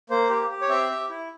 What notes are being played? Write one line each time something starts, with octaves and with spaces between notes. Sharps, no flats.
A#3 C5
G4
G4
C#5
C4 E5
G4
E4